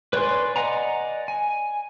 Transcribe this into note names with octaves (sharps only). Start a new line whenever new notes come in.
B4 C#5 D5 G#5 C6
D5 D#5 F#5 G#5 A#5
G#5